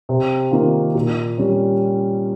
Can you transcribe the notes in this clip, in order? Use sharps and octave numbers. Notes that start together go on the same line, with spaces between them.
C3
D#3 A#3 F4
A#2
G3 C#4